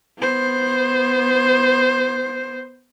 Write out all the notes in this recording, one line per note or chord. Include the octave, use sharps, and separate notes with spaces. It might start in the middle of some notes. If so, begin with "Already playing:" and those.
B3 C5